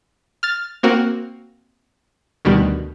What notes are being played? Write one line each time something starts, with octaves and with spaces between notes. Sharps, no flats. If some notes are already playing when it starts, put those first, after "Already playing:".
F6 A6
A#3 C4 F#4 A#4
D2 B2 D#3 G3